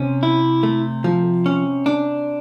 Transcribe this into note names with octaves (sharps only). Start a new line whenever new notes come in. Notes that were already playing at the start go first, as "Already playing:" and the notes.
Already playing: C3 C#4
E4
A3
F3
C#4
D4